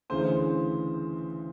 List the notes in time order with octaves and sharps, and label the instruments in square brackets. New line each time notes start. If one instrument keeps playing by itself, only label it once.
[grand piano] D2 C#3 E3 C5